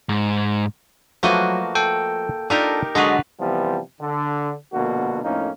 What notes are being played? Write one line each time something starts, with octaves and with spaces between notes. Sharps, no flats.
G#2
F3 F#3 A3 A#3 F#4 B4 D#5
A4 G5
D4 D#4 F4 G4 A4 A#4 D5
D3 F#3 G#3 F#4 A4 B4 D#5
C3 E3 F3 G3 B3
D3
A#1 B2 D3 A#3 F#4
F2 A2 A#3 C#4 D#4